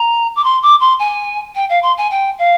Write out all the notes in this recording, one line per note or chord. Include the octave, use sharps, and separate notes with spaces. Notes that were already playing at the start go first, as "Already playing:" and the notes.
Already playing: A#5
D6
C6
D6
C6
G#5
G5
F5
C6
G#5
G5
F5